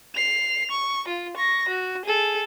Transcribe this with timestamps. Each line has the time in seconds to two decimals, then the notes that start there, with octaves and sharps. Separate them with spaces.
0.15 C7 F7
0.71 C#6
1.08 F4
1.36 C#6 A#6
1.69 F#4
2.05 G#4 A4